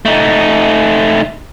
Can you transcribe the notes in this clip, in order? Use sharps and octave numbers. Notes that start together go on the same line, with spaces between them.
A3 D#4